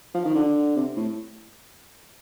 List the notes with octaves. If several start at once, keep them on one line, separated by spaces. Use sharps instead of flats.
F3
D#3
D3
C3
A2